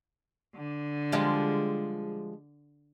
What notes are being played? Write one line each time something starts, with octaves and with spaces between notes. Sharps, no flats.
D3
F3 G3 G#3